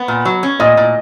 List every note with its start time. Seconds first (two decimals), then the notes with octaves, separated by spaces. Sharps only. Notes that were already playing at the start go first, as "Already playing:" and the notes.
Already playing: B3
0.08 A#2
0.25 F#3
0.43 C#4
0.60 A#2 D#5
0.77 A#2